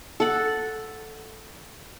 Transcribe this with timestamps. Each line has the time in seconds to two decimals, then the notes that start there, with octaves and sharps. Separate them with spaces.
0.20 A4 F#5